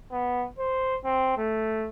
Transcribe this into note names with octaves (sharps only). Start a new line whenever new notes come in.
B3
C5
C4
A3